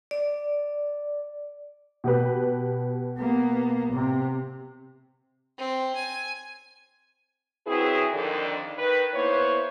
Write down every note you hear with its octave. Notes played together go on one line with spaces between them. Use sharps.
D5
B2 G4 B4
A#3 B3
C3
C4
G#5
F#2 F#3 C4 E4 G#4 B4
F2 D3 D#3
D#3 B4
A#3 B3 E4 C5 C#5